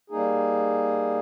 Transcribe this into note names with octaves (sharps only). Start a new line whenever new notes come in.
G3 A#3 D#4 G#4